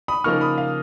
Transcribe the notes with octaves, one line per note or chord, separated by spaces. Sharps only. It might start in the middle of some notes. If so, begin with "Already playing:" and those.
B5 D#6
C#3 F3 A#3 D#4 C#6 F6
B5 D#6
F5